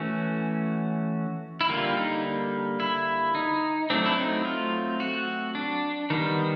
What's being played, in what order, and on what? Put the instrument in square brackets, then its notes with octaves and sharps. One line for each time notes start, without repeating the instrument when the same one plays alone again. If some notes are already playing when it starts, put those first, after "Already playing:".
Already playing: [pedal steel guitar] E3 A3 C#4 F#4
E4
D3 G3 A#3 F4
D#4
E4
D#4
F#3 A3 C4 D4
E4
D#4
F4
F#4
D4
D#3 G3 B3 D#4